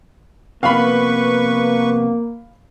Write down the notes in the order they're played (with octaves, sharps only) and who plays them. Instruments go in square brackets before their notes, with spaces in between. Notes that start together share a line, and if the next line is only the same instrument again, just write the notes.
[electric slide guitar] C3 F3 B3 [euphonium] A#3 [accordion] B4 C#6 [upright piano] F5 B5